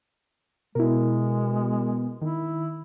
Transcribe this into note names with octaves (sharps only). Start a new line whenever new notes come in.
B2 G#3 E4 A#4
D#3 E4